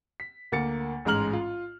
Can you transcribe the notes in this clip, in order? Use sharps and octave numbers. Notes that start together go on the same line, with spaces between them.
B6
D2 A#3 A6 C#7
A1 G#2 G#3 A#5 F6 F#7
F4